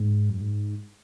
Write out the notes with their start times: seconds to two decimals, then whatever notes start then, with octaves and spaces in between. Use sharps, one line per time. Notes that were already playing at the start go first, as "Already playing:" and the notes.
Already playing: G#2
0.30 F#2
0.41 G#2